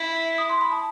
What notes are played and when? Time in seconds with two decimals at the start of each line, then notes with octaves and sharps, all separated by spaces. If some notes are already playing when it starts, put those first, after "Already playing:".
Already playing: E4
0.38 D#6
0.49 C6
0.61 B5
0.72 A5